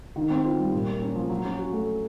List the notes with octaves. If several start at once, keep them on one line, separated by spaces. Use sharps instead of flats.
D#3
C4
F4
G3
A#2
A#3
C#4
F3
F#3
C#4
F#4
A3